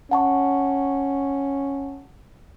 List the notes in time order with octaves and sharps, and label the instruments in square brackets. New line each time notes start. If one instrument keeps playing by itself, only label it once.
[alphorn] C#4 [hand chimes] F#5 A5 C#6